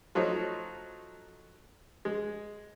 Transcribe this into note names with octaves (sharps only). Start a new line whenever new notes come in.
F3 F#3 A3 D#4
G#3